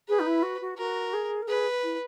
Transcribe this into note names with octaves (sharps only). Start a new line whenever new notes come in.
G#4 B4
D#4
E4
F#4
F#4
F#4 A#4
G#4
A#4
G#4 B4
E4